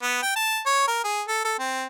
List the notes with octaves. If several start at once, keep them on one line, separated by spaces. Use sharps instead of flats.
B3
G5
A5
C#5
A#4
G#4
A4
A4
C4